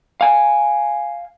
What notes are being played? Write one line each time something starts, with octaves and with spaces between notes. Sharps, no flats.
F5 G#5